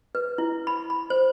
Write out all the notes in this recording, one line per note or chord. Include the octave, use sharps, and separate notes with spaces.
B4
E4
B5
B5
C5